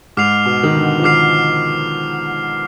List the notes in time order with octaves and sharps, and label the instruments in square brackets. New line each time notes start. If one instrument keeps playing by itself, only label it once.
[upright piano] G#2 [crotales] D6 F6 C7 F7
[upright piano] B2
D#3
D3
F3
[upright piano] D#3 [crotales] D6 F6 C7 F7